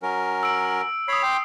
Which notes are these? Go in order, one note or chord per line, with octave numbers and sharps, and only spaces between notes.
F#3 C#4 A#4
E6 D7
C#5 B5 D#6 C7
G5 C6 D6